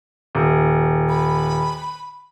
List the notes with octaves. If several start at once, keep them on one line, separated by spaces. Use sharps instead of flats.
D#1
B5